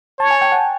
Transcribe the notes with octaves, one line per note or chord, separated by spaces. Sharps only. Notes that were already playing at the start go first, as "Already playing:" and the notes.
C#5 A5
G#5
G5
F#5